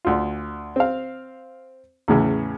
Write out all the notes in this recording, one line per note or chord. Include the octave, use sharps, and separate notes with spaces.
D2 F4
C4 F5
E2 A2 C#3